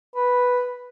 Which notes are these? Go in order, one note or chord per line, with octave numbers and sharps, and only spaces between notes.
B4